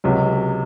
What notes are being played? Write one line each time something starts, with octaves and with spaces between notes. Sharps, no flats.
C#2 C3 F#3